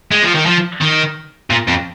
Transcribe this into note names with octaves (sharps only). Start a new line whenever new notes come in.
G#3
F3
D#3
F3
D#3
A#2
F2